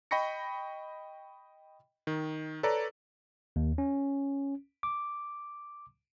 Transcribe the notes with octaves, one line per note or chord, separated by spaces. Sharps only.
D#5 G5 B5 C#6 A#6 C#7
D#3
A4 B4 C#5 D5 A#5
D#2
C#4
D6